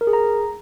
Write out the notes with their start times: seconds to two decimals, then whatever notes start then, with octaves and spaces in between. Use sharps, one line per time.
0.01 A#4
0.07 G#4
0.13 A#5